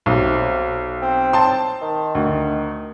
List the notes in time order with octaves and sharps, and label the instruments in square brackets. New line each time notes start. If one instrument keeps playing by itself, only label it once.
[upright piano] B1 [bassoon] C3
[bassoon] C4
[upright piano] A5 C6
[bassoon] D#3
[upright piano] D2